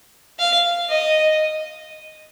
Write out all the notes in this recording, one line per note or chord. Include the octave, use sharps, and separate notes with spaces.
F5
D#5